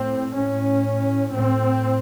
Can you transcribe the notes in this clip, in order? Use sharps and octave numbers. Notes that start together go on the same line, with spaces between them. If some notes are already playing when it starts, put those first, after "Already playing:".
Already playing: A2 C4
A2 C#4
A2 C4